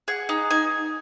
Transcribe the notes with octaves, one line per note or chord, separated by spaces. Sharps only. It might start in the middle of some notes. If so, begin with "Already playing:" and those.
G#4 F#5
D#4
D#4 G#5